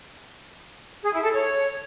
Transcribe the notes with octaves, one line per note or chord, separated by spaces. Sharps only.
G#4
E4
A4
C#5